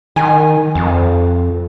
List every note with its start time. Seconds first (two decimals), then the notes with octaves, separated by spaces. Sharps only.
0.16 D#3 G#5
0.75 F2